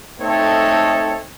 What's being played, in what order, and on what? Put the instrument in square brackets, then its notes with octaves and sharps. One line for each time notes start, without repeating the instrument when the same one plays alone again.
[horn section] A3 C4 D#4 A4 C#5